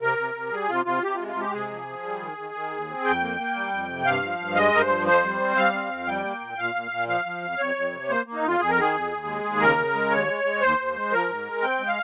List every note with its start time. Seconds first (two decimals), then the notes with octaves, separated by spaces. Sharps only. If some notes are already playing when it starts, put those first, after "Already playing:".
0.02 C3 A#4
0.18 C3
0.35 C3
0.51 G3 G#4
0.69 C3 F4
0.85 C3 F4
1.03 C3 G4
1.15 F4
1.20 G#3
1.28 F4
1.36 G#3 G4
1.53 C3 G#4
1.70 F3
1.87 F3
2.03 G3
2.20 D#3
2.38 D#3
2.55 D#3
2.70 D#2
2.88 C4
3.04 F2 G5
3.22 A#3
3.38 A#3
3.55 G3
3.71 F2
3.89 C3
4.05 G2 F5
4.23 F3
4.39 G2
4.55 G#3 D#5
4.73 G2 A#4
4.81 C5
4.89 F3
5.06 F2 C5
5.24 G3
5.41 C4
5.57 G3 F5
5.73 C4
5.90 F2
6.07 G3 G5
6.24 A#3
6.41 A#2
6.58 A#2 F5
6.75 A#2
6.91 A#2
7.08 F3 F5
7.25 F3
7.42 F2
7.58 F2 C#5
7.75 F2
7.92 C3
8.09 A#3 C5
8.26 A#3
8.34 D#4
8.42 F2
8.48 F4
8.60 F2 G#4
8.70 A#4
8.77 D#3 G#4
8.94 F2
9.11 D#2
9.26 G#3
9.44 D#2
9.60 C#3 A#4
9.78 C#3
9.94 G#3
10.11 D#2 C#5
10.27 G#3
10.44 G#3
10.61 D#2 C5
10.78 D#2
10.95 G#3
11.11 F3 A#4
11.28 G#2
11.46 G#3
11.62 C4 G5
11.79 G#3
11.88 F5